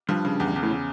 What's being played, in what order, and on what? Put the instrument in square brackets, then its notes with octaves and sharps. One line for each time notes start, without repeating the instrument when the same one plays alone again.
[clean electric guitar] G2 [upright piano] F3
[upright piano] C#3
E2
E2
[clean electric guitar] A2
[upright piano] C#3